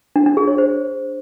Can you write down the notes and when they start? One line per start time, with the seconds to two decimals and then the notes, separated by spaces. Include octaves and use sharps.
0.16 D4
0.26 D4
0.37 G#4
0.48 C#5
0.58 C5